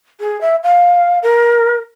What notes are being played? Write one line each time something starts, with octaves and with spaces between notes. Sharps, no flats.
G#4
E5
F5
A#4